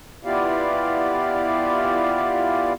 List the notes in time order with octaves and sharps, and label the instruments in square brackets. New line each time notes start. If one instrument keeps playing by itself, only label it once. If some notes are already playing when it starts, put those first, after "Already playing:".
[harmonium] B3 E4 F4 G4 D5 F5